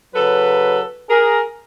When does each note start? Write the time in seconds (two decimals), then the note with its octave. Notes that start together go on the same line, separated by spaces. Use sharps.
0.15 C#3 F#3 A4 B4
1.10 G#4 A#4